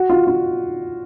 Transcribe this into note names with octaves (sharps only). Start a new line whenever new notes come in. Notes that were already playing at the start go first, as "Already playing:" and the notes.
Already playing: F#4
F4
F4